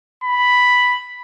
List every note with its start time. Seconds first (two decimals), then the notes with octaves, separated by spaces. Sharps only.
0.24 B5